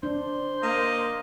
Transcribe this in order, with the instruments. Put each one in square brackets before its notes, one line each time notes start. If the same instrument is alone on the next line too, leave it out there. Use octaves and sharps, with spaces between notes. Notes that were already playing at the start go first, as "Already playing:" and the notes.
[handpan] D4 [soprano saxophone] C5
[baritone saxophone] A#3 [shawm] D#5